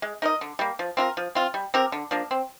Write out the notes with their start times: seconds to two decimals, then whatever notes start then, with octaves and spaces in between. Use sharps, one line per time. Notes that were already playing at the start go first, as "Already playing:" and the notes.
0.02 G#3
0.22 D#4 A#4 D#5
0.41 D3
0.59 G3 A#3
0.79 F3
0.97 C4 F4 A#4
1.17 F3
1.35 C4 F4
1.54 G3
1.74 C4 G4 A#4
1.92 D3
2.11 F3 A#3 D4
2.31 C4